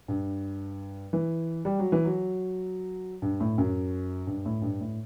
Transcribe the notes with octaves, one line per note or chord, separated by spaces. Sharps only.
G2
E3
G3
F#3
E3
F#3
G2
A2
F#2
G2
A2
G2
A2